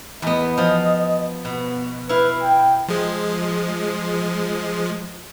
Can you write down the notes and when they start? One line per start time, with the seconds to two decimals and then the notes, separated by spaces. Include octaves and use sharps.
0.22 E2 B3 D#5
0.58 F3
1.45 B2 B3
2.09 E4 B4 F5
2.43 G5
2.89 F3 G#3